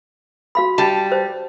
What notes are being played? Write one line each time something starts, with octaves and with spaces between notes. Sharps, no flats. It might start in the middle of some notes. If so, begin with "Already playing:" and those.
F#4 F5 B5
G3 A5
C5